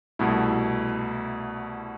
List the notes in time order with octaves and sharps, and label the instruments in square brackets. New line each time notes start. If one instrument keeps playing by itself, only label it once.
[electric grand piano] C2 B2 A3 E4